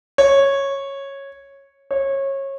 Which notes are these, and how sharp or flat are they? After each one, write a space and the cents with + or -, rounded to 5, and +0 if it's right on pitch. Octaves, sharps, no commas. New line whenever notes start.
C#5 -10
C#5 -25